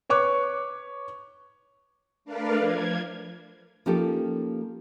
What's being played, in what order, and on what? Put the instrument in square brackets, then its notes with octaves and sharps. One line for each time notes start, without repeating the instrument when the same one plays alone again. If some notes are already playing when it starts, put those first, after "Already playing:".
[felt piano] B4 C#5 C#6 D6 F#6
[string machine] A3 D4 A#4 B4 D5 F5
F3 G#6
[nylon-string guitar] F3 A#3 C#4 D#4 G4 A4